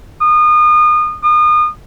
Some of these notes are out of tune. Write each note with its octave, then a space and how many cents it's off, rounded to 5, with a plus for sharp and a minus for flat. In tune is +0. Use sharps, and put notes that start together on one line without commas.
D#6 -30
D#6 -35